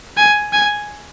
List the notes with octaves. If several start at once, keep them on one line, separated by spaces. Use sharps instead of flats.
G#5
G#5